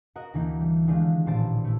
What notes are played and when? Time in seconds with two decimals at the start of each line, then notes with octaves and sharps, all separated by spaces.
0.16 F#4 A#4 D#5 F#5
0.34 D2 E3 A#3 D#4
0.60 G3
0.87 D3 D#3 G#3 A3 D4 F4
1.26 A1 A#2 C5 A5 A6 D7
1.64 A3 E4